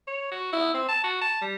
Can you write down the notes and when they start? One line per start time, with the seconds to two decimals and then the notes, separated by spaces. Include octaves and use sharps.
0.07 C#5
0.31 F#4
0.52 E4
0.74 C4
0.88 A5
1.04 F#4
1.21 A5
1.42 G3